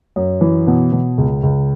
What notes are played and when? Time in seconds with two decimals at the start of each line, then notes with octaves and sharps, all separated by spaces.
0.16 F#2
0.41 E3
0.67 B2
0.92 B2
1.18 C#2
1.43 C#2